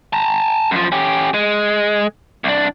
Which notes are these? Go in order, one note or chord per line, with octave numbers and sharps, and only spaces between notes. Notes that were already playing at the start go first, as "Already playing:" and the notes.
A5 A#5
F#2 F3
C#4 G4
G#3
C2 D4